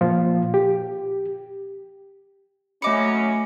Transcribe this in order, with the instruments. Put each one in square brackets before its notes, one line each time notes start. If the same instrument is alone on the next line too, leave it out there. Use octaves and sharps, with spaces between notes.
[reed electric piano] A#2 F3 F4
G4
[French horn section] F#3 C#4 [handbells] A3 D#5 C#7 [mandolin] B5 D6